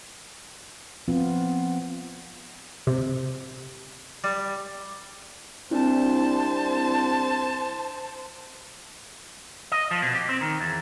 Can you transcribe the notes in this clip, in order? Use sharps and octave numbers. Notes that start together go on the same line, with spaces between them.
F3 B3 C4 F4
C3
G3
C2 C4 D4 E4 C5 A5
D#5
F3
B2
G4
C4
D#3
E2